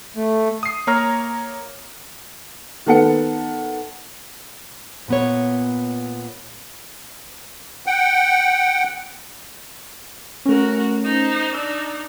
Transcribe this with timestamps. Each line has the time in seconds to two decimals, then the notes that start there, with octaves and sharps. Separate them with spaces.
0.16 A3
0.63 D#6 C7
0.87 A#3 C#5 A#5 F6
2.86 D#3 B3 A4 F#5 C#7
5.08 A#2 B3 C#5
7.86 F#5 G5
10.45 A3 C#4 F#4 A#4
11.05 D#4 C5
11.54 D4 D#4 E6